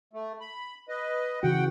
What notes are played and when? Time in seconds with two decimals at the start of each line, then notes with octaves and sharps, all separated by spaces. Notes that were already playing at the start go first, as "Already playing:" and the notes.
0.13 A3
0.41 B5
0.88 B4 D#5
1.43 C#3 E3 F#4 F#5 G5